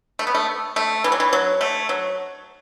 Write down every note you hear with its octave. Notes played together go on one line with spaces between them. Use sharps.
A3
B3
A3
A3
E3
F#3
E3
F#3
A3
F#3